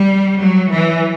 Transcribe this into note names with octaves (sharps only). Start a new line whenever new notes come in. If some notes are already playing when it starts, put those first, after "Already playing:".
Already playing: G3
F#3
E3